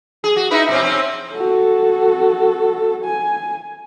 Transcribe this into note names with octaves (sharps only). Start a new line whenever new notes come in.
G#4
F#4
D#4 E4 B4
B2 C4 C#4
C4 C#4
F#4 A4
G#5